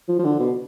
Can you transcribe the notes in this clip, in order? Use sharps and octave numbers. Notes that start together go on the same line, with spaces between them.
F3
F3
D3
B2